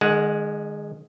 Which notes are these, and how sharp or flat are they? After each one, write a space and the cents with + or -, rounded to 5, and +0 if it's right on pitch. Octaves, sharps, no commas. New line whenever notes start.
D#3 -45 G#3 +0 F#5 -10